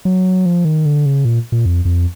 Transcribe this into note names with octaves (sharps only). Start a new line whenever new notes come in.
F#3
F3
D#3
D3
C#3
A#2
A#2
F2
F2